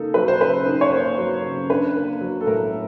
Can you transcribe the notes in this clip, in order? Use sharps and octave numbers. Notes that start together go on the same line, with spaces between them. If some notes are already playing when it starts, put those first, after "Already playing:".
Already playing: C#3 A#3 D#4 A4
F#3 B4
C5
C#3 B4
D#4
C#5
A#3 C5
F#3
C#3
D4 B4
A#3
F#3
A4
A2 A#4